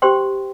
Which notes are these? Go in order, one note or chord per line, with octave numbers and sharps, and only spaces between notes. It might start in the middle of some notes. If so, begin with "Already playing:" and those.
G4 C5 G5 C6